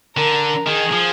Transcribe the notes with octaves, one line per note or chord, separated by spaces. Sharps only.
D3 A#4
D#3 G#4
F3